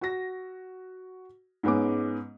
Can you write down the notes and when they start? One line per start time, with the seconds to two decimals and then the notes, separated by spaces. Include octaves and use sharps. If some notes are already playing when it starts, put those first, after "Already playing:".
0.01 F#4 A#6
1.63 G#2 G#3 B3 C#4 D6